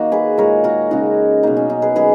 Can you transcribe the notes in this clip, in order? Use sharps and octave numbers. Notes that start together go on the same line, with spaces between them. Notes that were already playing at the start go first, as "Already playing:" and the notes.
Already playing: D#3 A#3 F#4
G#4 B4
A#2 G#3 A#4 C#5
F#4 A#4
C#3 G#3 D#4 F#4
B2 F#3 A#3 D#4
C#4
D#4
G#4 B4
D#3 F#3 A#3 G#4 B4